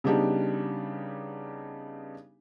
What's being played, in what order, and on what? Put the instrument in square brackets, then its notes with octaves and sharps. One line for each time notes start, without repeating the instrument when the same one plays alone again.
[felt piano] C#3 G3 B3 D4 D#4 G4